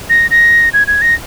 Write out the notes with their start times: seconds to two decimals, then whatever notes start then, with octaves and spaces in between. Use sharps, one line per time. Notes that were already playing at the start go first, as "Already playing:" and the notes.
0.10 A#6
0.31 A#6
0.73 G#6
0.87 G#6
1.02 A#6